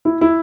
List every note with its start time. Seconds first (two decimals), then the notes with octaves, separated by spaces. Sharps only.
0.05 E4
0.21 E4